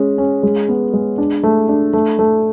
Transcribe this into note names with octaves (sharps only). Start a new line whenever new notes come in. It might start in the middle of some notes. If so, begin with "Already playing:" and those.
Already playing: G#3 C#4
C#4
G#3
B3
G#3
D4
A3
D4
A3
A3